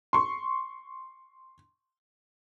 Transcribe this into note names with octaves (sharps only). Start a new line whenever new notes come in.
C6 C#6